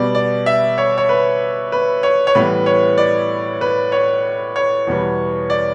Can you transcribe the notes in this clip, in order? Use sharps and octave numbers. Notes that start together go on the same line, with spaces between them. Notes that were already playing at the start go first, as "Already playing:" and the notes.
Already playing: B2 G3 B3 D5
D5
E5
C#5
C#5
B4
B4
C#5
C#5
A2 E3 G3 B3 B4
C#5
D5
B4
C#5
C#5
E2 B2 G3 B3
D5